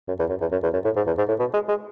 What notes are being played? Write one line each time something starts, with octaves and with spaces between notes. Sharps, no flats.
F#2
E2
F#2
E2
F#2
E2
F#2
A2
G#2
E2
G#2
A2
B2
G#3
G#3